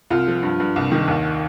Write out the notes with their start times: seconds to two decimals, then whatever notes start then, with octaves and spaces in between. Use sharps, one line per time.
0.10 C2 F4
0.28 F3
0.43 G2
0.60 G2
0.76 C2
0.92 D#3
1.08 D#2